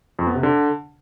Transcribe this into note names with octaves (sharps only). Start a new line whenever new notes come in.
F2
B3
C3
D3